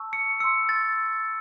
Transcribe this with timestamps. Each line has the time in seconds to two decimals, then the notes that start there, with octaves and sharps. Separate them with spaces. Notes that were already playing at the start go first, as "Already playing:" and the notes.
Already playing: A5 C#6 E6
0.13 C#7
0.40 E6 C#7
0.44 C6
0.69 A6